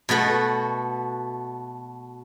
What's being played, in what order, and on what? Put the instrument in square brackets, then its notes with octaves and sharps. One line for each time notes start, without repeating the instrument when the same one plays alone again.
[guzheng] B2 A3 F#4 B4